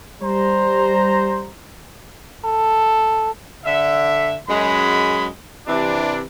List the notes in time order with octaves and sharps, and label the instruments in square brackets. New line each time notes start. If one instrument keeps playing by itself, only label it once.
[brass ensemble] G3 C5 A#5
[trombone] A4
[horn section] D3 E5
F#2 G#3 B5
C3 E3 D4